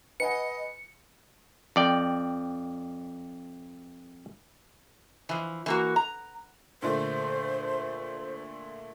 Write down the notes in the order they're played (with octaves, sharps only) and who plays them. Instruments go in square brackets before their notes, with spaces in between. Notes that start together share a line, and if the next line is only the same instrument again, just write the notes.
[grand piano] B4 F#5 G#5 [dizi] D#5 [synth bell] C#7
[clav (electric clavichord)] F2 D5 G5
[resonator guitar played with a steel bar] E3 F3
E3 A#3 F#4
A#5
[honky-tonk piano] A#2 D3 A3 [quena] C5